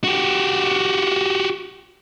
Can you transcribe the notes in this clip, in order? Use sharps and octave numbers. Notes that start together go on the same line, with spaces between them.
F#4 G4